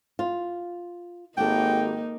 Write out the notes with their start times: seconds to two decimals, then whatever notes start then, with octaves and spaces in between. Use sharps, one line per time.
0.19 F4
1.38 G#1 A#3 D#4 F#4 G4 A4 G5